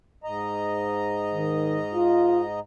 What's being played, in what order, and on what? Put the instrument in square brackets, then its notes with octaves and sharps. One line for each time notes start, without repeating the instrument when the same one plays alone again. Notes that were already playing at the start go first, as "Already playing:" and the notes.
[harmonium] G#2 D#5 A#5
[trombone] D#3
F4